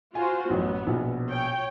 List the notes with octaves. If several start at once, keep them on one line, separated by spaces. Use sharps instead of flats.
F4 F#4 C5 G#5
A1 F#2 B3
A#1 B2
C#5 G5